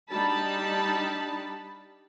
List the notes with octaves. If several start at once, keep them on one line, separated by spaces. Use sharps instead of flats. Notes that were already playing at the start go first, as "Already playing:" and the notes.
G3 D4 D#4 A5 B5